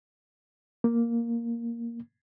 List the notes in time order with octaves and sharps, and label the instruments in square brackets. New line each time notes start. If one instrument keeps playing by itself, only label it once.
[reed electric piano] A#3